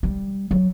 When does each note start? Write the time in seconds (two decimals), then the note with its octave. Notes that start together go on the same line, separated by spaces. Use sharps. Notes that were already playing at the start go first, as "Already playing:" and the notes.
0.03 G3
0.51 F#3